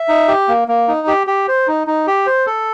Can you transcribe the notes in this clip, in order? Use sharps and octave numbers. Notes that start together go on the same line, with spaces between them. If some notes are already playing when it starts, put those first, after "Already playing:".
Already playing: E5
D#4
G4
A#3
A#3
D#4
G4
G4
C5
D#4
D#4
G4
C5
A4